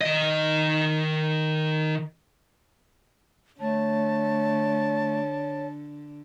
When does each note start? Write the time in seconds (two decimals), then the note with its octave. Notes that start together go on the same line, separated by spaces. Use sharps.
0.01 D#3 D#5
3.60 D3 A3 C#5 A5